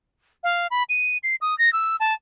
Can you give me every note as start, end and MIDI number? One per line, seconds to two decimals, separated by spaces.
0.44 0.67 77
0.71 0.83 83
0.89 1.18 99
1.23 1.36 96
1.41 1.57 87
1.58 1.72 94
1.73 1.96 88
2.00 2.14 81